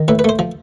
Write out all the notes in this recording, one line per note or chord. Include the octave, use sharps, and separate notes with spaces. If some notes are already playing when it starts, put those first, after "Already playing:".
Already playing: D#3
A2 B4
B4
A3 C5
F3